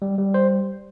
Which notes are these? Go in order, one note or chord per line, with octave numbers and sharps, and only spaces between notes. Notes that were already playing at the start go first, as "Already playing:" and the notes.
G3
G3
C5